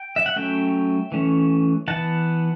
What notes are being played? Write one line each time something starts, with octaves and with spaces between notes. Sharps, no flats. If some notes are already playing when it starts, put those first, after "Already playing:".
Already playing: G5
E5
F#5
F#3 A3 C#4 E5 G5
E3 A3 C#4
E3 B3 F#5 A5